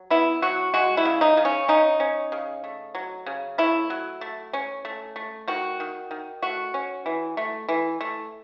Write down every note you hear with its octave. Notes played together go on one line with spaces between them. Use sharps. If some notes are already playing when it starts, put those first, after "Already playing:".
Already playing: F#3
B3 E4
F#3 F#4
G#3 F#4
E4
C#3
D#4
C#3
C#4
C#4 D#4
C#4
C#3
A3
F#3
C#3
A3 E4
F#3
A3
C#4
A3
A3
D#3 F#4
D#3
D#3
A3 F#4
C#4
E3
A3
E3
A3